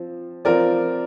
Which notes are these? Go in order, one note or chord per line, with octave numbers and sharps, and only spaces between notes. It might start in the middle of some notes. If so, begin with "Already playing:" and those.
Already playing: F3 C4
F3 C4 F4 A#4 D5